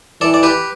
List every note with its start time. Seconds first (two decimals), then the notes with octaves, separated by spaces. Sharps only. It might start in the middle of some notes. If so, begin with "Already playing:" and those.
0.21 E3 A4 D5
0.34 D5
0.43 G4 B4